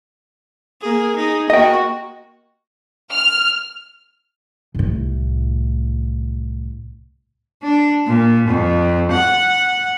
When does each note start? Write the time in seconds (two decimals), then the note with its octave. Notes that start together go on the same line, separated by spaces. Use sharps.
0.81 A#3 G#4
1.16 D#4 G#4
1.50 A#3 F#4 D#5 G5
3.12 F6
4.75 C2 A2
7.63 D4
8.07 A#2
8.49 F2
9.11 F#5